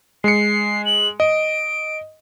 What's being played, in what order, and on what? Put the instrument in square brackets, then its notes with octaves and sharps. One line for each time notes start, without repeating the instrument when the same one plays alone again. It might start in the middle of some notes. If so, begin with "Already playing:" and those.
[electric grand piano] G#3 C#7 [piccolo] C7
[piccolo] F#7
[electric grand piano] D#5 [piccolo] D7